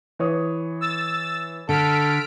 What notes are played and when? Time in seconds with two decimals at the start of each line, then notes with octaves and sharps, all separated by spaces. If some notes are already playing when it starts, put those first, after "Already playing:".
0.19 E3 C#5 D#6
0.81 E6 A6
1.69 D3 A4 F6 B6 D7